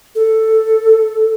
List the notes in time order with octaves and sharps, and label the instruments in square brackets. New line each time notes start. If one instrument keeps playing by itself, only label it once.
[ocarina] A4